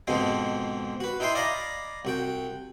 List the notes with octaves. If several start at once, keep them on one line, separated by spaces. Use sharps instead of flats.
G#2 B2 D3 F3 G#3 C4
F#4 B4
D#4 E4 G5 G#5 C6
D5 D#5 F5 G#5 A#5 B5
C2 F#4 G5